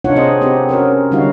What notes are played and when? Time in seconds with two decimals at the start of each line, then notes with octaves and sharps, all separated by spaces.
0.05 C3 D4 D#4 F4 C#5 F#5
0.16 C4 D#4 G#4 C5 D#5
0.41 B3 C4 D#4 G4 B4
0.69 C#4 F#4 A#4 C5 C#5
1.11 D3 G3 D#4 E4 F#4 F5